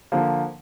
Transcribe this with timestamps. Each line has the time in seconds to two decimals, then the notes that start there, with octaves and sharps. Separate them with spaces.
0.12 D3 F3 A#3